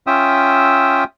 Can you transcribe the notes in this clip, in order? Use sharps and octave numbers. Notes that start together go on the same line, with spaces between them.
C#4 F4 E5 G5 D#6 E6